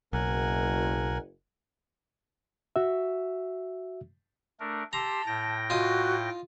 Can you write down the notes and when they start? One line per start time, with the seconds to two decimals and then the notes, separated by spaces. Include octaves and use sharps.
0.13 F#1 B1 A#4 F#5 G#5
2.76 F#4 E5
4.60 A3 D4 A#4
4.93 G4 A5 A#5 C6 E6
5.27 A2 G5 A#6
5.70 F4 F#4 D#5